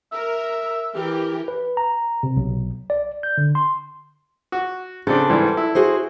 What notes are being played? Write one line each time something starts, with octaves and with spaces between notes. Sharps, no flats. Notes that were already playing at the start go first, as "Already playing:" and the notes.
A#4 E5
E3 G4 A#4
B4
A#5
C3
B1
D5
G6
D3
C6
F#4
C#3 C4 D4 A4
G#2 E3 G3
E4
F#4 G#4 C5